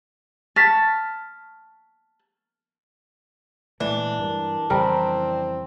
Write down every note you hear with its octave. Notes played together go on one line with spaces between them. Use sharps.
A5 C#6 F6 B6
A#2 E3 G#3 A3 D4
G2 A#4
F2 C#3 E3 G3 C4 A#4